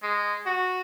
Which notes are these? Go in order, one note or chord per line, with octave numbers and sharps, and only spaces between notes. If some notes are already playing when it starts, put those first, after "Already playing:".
G#3
F#4